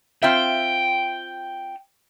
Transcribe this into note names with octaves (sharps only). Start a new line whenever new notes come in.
C4 F4 E5 G5